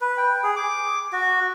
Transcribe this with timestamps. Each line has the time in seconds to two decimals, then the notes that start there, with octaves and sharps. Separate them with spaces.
0.01 B4
0.17 G5
0.43 G#4
0.56 D6
1.13 F#4